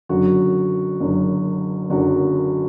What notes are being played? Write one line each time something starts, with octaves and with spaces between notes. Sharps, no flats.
F#1 F#2 D3 F#4
F#1 F#2 D3
F#1 F#2 D3 F#4